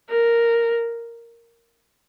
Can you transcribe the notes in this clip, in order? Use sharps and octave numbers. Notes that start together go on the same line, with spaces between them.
A#4